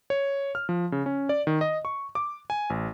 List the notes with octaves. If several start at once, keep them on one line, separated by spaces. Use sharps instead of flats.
C#5
F6
F3
C#3
C#4
D5
D#3
D#5
C#6
D6
G#5
A1